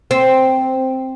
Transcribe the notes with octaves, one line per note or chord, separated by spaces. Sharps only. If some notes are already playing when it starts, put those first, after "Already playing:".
C4